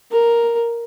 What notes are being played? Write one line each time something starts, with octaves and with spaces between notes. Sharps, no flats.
A#4